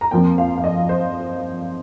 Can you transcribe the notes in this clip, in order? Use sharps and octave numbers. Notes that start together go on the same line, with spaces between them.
A#5
F2 F3 A#3 G5
F5
F5
D#5
C5